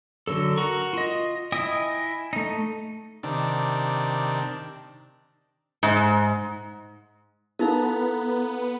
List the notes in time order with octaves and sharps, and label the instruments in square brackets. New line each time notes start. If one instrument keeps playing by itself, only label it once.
[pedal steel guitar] D3 F#3 A4
F#4 A#4 A#5 C#6
F4 D#5
E4 D#5 G5 G#5 D#6
A3 D#4
[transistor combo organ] C3 D#3 D4
[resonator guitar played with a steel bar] G#2
[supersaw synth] B3 [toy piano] D#4 E4 A#4 [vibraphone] A4 F5 A#5